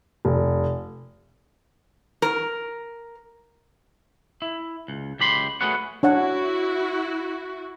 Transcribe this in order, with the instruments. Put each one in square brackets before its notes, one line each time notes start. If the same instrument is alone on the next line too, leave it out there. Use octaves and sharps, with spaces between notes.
[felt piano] F1
[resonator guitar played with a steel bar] A#4
[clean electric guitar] E4
C#2
C#2 G4 B5 C6
A3 F#4 G#4 B4 C#5 F#5
[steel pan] D4 C#5 F#5 [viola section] E4 F#4